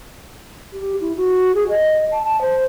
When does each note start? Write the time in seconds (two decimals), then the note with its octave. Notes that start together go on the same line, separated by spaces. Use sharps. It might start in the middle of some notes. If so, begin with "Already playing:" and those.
0.73 G4
1.01 E4
1.16 F#4
1.55 G#4
1.69 D#5
2.11 A5
2.25 A5
2.42 C5